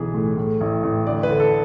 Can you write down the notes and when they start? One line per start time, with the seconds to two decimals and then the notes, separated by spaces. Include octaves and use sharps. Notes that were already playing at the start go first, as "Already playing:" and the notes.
Already playing: B1 E3 G#4
0.14 A2
0.37 A2
0.61 A1
0.83 A1
1.06 D2 D5
1.23 B4
1.29 D3
1.40 A4